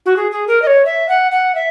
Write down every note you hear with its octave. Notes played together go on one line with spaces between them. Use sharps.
F#4
G#4
G#4
A#4
D#5
C#5
E5
F#5
F#5
E5